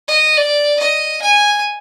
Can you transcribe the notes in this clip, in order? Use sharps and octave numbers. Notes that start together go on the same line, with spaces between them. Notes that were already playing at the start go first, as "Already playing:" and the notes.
D#5
D5
D#5
G#5